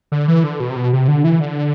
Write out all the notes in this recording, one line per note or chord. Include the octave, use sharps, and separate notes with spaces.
D3
E3
D3
B2
C3
B2
C3
D3
E3
D3